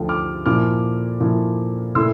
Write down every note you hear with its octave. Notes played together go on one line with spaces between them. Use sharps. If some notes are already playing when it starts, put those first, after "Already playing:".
Already playing: D2 D3 F3 A3 G5
D6 F6
A#2 F3 A#3 E4 D6 F6
A#2 F3 A#3 E4
A#2 A3 E4 C6 E6